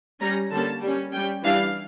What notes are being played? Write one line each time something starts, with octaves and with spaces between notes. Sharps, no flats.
G3 C#4 A#5
D3 G3 A#3 C#4 A5
G3 C#4
G3 C#4 G5
E3 G3 D4 F5